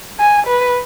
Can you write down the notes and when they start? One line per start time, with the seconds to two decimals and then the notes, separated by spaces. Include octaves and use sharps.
0.19 G#5
0.47 B4